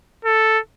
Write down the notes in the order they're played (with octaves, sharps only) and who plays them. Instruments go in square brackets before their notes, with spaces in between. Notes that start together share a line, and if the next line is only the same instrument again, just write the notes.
[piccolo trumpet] A4